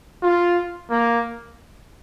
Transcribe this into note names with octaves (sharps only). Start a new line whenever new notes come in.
F4
A#3